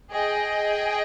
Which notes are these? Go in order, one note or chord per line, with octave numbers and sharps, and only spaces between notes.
G#4 D#5 G5